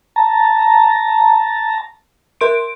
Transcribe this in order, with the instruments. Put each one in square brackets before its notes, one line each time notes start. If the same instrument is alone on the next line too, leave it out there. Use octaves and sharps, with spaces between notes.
[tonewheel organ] A5 A#5
[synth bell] A#4 C6 D7